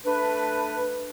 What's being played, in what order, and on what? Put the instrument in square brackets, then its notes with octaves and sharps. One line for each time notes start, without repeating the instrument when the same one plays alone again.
[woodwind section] A3 D4 B4